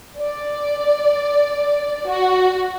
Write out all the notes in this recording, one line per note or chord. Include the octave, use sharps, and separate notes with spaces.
D5
F#4